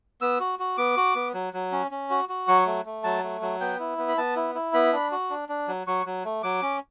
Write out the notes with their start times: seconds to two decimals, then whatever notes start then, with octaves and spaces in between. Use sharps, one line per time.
0.21 B3 E6
0.40 F#4
0.59 F#4
0.77 B3 D6
0.97 F#4
1.15 B3
1.34 F#3
1.53 F#3
1.72 C#4
1.91 C#4
2.10 F#4
2.29 F#4
2.48 F#3 C#6
2.66 A3
2.86 A3
3.04 F#3 A5
3.23 A3
3.42 F#3
3.60 B3 G5
3.80 E4
3.98 B3
4.08 B5
4.17 B3 A5
4.36 E4
4.55 E4
4.73 B3 B5
4.92 D4
5.12 F#4
5.30 D4
5.49 D4
5.68 F#3
5.87 F#3 C#6
6.06 F#3
6.25 A3
6.43 F#3 D6
6.62 C#4